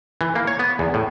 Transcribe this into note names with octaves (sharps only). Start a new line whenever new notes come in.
E3
A#3
C#5
B3
E2
A2